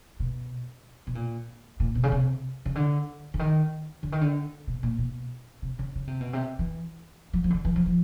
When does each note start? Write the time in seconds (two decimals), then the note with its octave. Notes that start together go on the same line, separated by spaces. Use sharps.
0.20 B2
1.07 B2
1.15 A#2
1.80 A#2
1.95 B2
2.03 C#3
2.12 C3
2.65 C#3
2.75 D3
3.34 D3
3.39 D#3
4.03 D3
4.12 D#3
4.21 D3
4.67 B2
4.83 A#2
4.98 B2
5.62 C3
5.79 C#3
5.95 C#3
6.07 C3
6.21 B2
6.33 C3
6.59 E3
7.33 F#3
7.44 F3
7.50 D3
7.54 D#3
7.65 E3
7.76 F3
7.86 F3